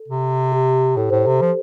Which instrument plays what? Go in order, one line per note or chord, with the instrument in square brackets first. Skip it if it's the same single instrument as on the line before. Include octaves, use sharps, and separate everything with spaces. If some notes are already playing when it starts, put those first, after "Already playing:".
Already playing: [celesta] A4
[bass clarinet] C3
[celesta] G4
[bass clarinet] A2 [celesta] A4
[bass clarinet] A2 [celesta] C5
[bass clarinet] C3 [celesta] A4
[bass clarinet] F3